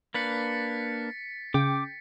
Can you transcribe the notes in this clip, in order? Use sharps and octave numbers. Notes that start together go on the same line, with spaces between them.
A#3 D4 B4 A6 B6 C#7
C#3 G5 D6